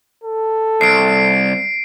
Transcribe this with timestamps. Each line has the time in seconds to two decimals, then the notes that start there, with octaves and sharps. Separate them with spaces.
0.24 A4
0.81 C2 C7 D7